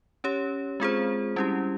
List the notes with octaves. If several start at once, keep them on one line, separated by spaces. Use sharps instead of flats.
C#4 G4 C#5
G#3 C4 F4 G#4 C5
G3 C#4 E4 G4